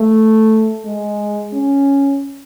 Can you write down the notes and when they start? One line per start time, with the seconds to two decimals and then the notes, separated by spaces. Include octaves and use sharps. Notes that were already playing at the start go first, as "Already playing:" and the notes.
Already playing: A3
0.86 G#3
1.54 C#4